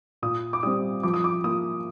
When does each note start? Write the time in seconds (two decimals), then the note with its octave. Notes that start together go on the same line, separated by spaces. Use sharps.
0.23 A#2 D#6
0.53 D6
0.63 G3 C4 D#6
1.03 F3 D6
1.14 D#6
1.24 D6
1.44 A#3 F4 D#6